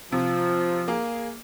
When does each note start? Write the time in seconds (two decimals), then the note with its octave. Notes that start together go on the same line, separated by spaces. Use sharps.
0.12 C3 F3
0.88 A#3 G#4